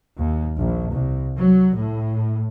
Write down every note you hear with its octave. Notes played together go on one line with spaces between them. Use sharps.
D#2
A#1
C2
F#3
A2